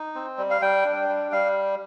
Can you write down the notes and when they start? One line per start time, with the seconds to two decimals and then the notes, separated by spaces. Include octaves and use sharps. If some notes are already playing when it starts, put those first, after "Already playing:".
Already playing: D#4
0.15 C4
0.38 G3
0.50 F5
0.62 G3 G5
0.85 D4
1.09 G3
1.32 G3 F5